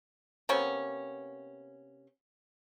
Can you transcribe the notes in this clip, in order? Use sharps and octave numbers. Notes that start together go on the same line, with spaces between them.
C3 A#3 B3 C#4